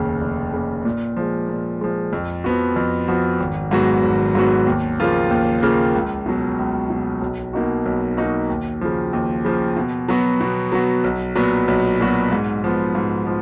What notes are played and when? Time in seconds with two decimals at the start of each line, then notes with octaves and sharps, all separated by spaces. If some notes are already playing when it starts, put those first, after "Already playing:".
Already playing: F1 D#2 C#3
0.21 F1
0.53 D#2 C#3
0.85 A#2
1.17 F3 G#3
1.49 A#2
1.81 F3 G#3
2.13 F2
2.44 F3 B3 F#4
2.76 F2
3.08 F3 B3 F#4
3.40 G#1
3.71 G#2 F#3 B3 F#4
4.03 G#1
4.35 G#2 F#3 B3 F#4
4.67 D#2
5.00 C#3 F3 A#3 F4
5.31 D#2
5.62 C#3 F3 A#3 F4
5.95 C#2
6.26 B2 F#3
6.59 C#2
6.90 B2 F#3
7.22 B1
7.53 B2 A#3 D#4 F#4
7.86 B1
8.17 B2 A#3 D#4 F#4
8.50 D#2
8.81 C#3 F3
9.13 D#2
9.45 C#3 F3
9.77 B2
10.08 F#3 B3 F#4
10.41 B2
10.72 F#3 B3 F#4
11.04 B1
11.35 A#2 F#3 B3 F#4
11.68 B1
12.00 A#2 F#3 B3 F#4
12.32 G#2
12.64 F3 B3
12.95 G#2
13.27 F3